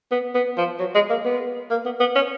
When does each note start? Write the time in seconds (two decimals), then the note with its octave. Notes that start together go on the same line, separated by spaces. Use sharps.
0.12 B3
0.35 B3
0.57 F3
0.80 F#3
0.95 G#3
1.10 A#3
1.25 B3
1.71 A#3
1.86 B3
2.00 B3
2.16 C#4